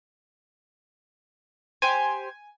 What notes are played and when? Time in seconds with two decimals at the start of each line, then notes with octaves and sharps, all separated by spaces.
1.82 G4 C5 G#5